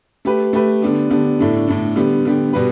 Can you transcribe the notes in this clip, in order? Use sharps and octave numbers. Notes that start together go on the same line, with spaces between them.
A3 G4 B4
A3 G4 B4
D3 B3 D4 G4
D3 B3 D4 G4
A2 A3 D4
A2 A3 D4
D3 G3 B3 G4
D3 G3 B3 G4
B2 G3 B3 G4 B4